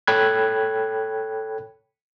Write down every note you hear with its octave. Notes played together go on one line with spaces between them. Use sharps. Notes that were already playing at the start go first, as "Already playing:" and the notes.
A4 C#5 G5 B5 F#6 G#6